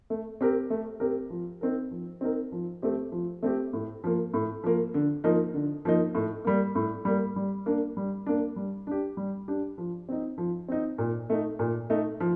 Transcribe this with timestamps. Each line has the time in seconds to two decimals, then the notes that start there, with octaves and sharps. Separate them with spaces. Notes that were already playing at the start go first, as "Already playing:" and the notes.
0.10 A3
0.41 C4 G4 A#4
0.70 A3
1.00 C4 G4 A#4
1.30 F3
1.61 C4 D#4 A#4
1.91 F3
2.21 C4 D#4 A#4
2.52 F3
2.82 A3 C4 G4
3.12 F3
3.43 A3 C4 G4
3.73 A2
4.04 F3 A#3
4.34 A2
4.64 F3 A#3
4.94 D3
5.24 F3 A#3 D#4
5.54 D3
5.85 F3 A#3 D#4
6.15 A2
6.45 G3 A#3
6.75 A2
7.05 G3 A#3
7.36 G3
7.66 A#3 D4
7.97 G3
8.26 A#3 D4
8.56 G3
8.87 D4 G4
9.17 G3
9.48 D4 G4
9.78 F3
10.09 C4 D#4
10.38 F3
10.68 C4 D#4
10.98 A#2
11.30 A3 D#4
11.59 A#2
11.90 A3 D#4
12.20 F3